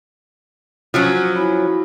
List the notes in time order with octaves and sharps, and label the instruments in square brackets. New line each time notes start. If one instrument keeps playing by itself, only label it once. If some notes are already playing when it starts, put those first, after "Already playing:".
[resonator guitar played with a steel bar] F3 F#3 C#4
[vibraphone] E4 F#4 B5